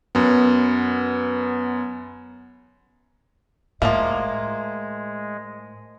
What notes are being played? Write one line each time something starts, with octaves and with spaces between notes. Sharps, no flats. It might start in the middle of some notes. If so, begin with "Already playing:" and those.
F#2 B3
A2 F3 G3 G#3 A#3 E5